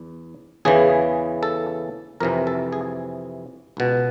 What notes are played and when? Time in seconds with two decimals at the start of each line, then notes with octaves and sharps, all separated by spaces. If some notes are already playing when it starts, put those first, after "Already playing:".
Already playing: E2
0.65 E2 C#3 E3 G#4
1.43 A4
2.20 F2 C3 E3 A#4
2.47 A4
2.73 G#4
3.77 C#2 B2